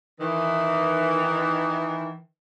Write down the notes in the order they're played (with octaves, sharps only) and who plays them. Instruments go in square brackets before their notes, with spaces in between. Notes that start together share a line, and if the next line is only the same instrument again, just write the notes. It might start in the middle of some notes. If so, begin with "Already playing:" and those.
[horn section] D#3 E3